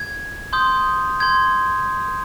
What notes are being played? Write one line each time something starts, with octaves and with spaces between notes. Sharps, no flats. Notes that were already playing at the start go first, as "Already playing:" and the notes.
Already playing: G#6
C6 D#6 G6
C6 G6 G#6